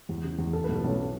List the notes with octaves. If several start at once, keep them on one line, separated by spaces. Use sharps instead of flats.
E2
C#3
E2
A2 A4
B4
B1
A4
B1 C#4